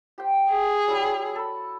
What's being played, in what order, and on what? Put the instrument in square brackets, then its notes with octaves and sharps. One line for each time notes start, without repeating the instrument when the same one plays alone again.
[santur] G4 C5 G5
[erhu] G#4
[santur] F#3 G3 E4
A4 B5